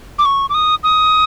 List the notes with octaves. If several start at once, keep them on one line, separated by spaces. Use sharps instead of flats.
D6
C#6
D6
D#6
D#6